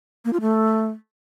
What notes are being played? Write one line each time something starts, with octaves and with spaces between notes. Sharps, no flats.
A#3
F4
A3